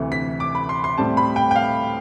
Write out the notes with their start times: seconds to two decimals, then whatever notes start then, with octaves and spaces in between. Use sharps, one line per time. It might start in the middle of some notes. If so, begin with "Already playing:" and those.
Already playing: D2 C3 E3
0.12 B6
0.40 D6
0.55 B5
0.69 C6
0.84 C6
0.98 A2 G3 C4 A5
1.17 B5
1.36 G5
1.51 G5
1.56 F5